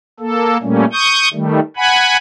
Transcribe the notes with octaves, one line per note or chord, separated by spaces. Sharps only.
A#3 A4
A#2 G3 A3 A#3 C#4
C#6 D#6 G6
D#3 G3 A3
F#5 G#5 B5